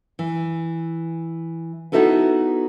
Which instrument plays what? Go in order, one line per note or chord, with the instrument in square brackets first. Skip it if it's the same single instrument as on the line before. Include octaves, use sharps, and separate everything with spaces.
[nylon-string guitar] E3
B3 D#4 E4 F#4 A4 B4